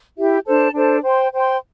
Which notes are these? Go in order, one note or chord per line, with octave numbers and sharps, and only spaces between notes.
E4 G4 E5
D4 A4 C5 A5
D4 A4 C5 A5
C5 G5 C6
C5 G5 C6